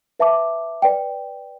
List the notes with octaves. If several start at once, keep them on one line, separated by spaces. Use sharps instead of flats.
B4 E5 A5 D6
B4 D5 G5